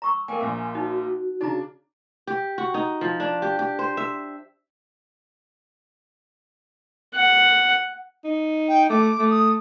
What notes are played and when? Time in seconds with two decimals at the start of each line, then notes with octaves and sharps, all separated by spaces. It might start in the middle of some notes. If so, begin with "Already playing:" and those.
0.02 A#5 C#6 E6
0.28 A#3 A#4 G5 G#5
0.40 A#1 A#2 E5
0.75 D#4 F#4
1.41 C#3 D4 D#4 A#5
2.27 G4
2.58 F#4
2.74 D#4
3.01 F3
3.20 D4
3.42 G4
3.59 G4
3.79 C5
3.97 E5
7.16 F#5
8.24 D#4
8.69 G5
8.90 A3 D6
9.19 A3
9.31 D#6